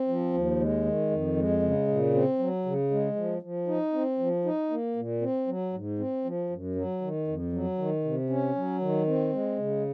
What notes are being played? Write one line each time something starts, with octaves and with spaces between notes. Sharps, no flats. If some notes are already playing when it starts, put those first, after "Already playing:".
Already playing: C4
F3
D#2
G#3
D#3
F2
G#3
C#3
A#2
C4
F#3
C#3
G#3
F3
F3
D#4
C4
F3
D#4
A#3
A#2
C4
F#3
G#2
C4
F3
F#2
F#3
D#3
F2
F#3
D#3
C3
C#4
F#3
D#3
C4
G#3
C#3